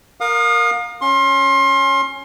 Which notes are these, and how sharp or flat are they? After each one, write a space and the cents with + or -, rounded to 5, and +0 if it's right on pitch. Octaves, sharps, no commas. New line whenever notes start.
A#4 +0 F5 +30 D#6 -30
C#4 +0 C6 +30